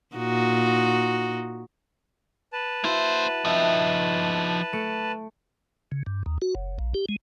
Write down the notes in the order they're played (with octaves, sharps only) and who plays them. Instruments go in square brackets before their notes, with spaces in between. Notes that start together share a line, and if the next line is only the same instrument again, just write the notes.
[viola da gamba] A#2 D#4 F#4
[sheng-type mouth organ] B4 A5
[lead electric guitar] A#3 C5 [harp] E4 F#4
[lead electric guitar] F3 D#4 [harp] E5 G5
[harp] A3 C#7 D7
[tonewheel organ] C#3
G2
D#2
F#4
F#1
A#1
G4
G#3